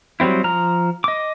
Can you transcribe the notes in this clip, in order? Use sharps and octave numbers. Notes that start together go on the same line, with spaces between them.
F#3 G3 C4 E4
F3 A#5 F6
D#5 D6